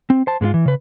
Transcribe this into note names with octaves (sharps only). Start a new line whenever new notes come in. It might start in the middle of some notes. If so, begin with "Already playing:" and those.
C4
C5 A5
G#2 G#3 A3 F4
E3
C#3 B4